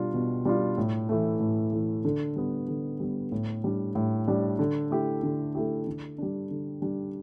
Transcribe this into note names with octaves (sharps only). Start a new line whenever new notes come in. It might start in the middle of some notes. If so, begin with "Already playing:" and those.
Already playing: B2 G3 D4 F4
B2
G3 D4 F4
A2
E3 A3
A2
E3 A3
D3
G3 B3
D3
G3 B3
A2
G3 D4
A2
G3 D4
D3
A3 E4 G4
D3
A3 E4 G4
D3
G3 D4
D3
G3 D4